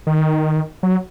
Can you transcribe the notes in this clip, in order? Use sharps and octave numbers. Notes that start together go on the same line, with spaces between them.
D#3
F#3